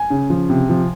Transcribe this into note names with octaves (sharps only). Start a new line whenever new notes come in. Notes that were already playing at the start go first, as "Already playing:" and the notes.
Already playing: G#5
C#3
F3
C3
F3